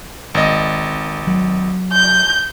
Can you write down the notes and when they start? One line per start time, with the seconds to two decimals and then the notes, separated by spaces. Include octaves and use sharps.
0.35 G#1 D#5
1.27 F#3
1.92 G6